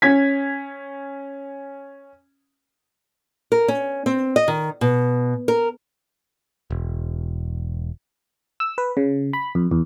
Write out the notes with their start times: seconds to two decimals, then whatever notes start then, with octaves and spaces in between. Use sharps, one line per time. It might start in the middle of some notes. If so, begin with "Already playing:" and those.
0.02 C#4 G#6 B6
3.52 A#4
3.68 C#4
4.06 C4
4.36 D#5
4.48 D#3
4.81 B2
5.48 A#4
6.70 E1
8.60 E6
8.78 B4
8.97 C#3
9.33 B5
9.55 F2
9.71 E2